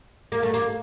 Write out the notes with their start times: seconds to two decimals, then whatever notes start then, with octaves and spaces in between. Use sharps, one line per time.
0.32 A#3
0.43 A3
0.54 A#3